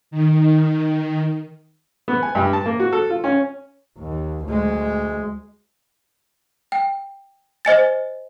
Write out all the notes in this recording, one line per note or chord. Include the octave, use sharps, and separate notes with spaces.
D#3
B3
G#5
G2
A5
A#3
F#4
A4
F4
C#4
D#2
D2 G#3
G5
C5 D#5 G#5 A6